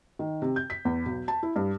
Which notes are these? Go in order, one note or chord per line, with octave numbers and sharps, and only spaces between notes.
D#3
C3
G6
B6
E2
B1
A5
E4
G2